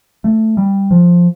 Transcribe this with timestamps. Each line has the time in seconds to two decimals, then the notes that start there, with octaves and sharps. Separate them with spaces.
0.24 A3
0.57 G3
0.91 F3